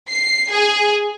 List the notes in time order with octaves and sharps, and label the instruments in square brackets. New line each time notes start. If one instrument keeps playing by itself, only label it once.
[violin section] C7
G#4